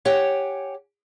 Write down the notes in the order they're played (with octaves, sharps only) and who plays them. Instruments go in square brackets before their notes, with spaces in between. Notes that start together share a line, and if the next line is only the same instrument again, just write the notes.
[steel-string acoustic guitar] G4 C#5 F#5 G#5